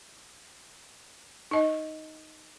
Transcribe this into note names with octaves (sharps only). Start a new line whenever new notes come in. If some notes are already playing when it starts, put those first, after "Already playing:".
D#4 D#5